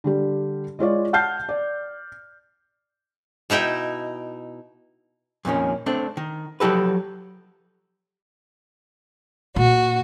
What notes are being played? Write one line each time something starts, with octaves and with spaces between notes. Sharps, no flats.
D3 G3 G4
G#3 F4 C#5 D5
F#5 A5 F6 G6 C7
D5
B2 D#4 E4 G5
F2 A#2 D#3 C#4
A3 C4 D4
D#3
F3 F#3 G4 A4 B4
A#2 F#4